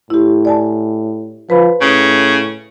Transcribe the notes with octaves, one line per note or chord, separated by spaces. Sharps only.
A2 E4 G4
D5 G#5 A5
F3 B4 B5
A2 C#3